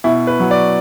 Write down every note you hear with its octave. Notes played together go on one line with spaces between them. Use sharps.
B2 E4
B4
F#3
D5